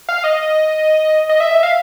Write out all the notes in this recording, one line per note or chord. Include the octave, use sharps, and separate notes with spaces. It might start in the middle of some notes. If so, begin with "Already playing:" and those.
F5
D#5
D#5
E5
E5
F5